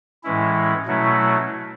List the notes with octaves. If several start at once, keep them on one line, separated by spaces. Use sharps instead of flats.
A2 E3 G#3 C#4 E4
B2 F#3 A3 C#4 E4